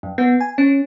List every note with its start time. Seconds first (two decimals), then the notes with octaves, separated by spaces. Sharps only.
0.03 F#2
0.18 B3
0.40 G#5
0.58 C#4